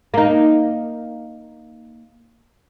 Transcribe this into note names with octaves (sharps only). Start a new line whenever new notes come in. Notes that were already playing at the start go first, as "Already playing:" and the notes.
A#3 D#4